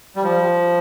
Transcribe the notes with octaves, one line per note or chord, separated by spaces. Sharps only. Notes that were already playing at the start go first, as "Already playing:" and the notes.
G3
F3